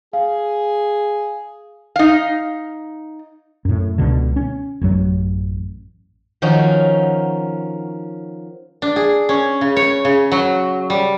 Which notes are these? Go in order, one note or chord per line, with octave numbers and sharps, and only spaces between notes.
G#4 F5
D#4 F5
F#2 A2
C#2 B2 D3
C#4
A1 F#2 F#3
D#3 F3 C#4 D#4 F#4
D4
G#4
C#4
C#3
C#5
C#3
F#3
G3